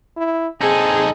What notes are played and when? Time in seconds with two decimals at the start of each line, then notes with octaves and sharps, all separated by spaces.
0.17 E4
0.61 C4 D#4 G#4 A4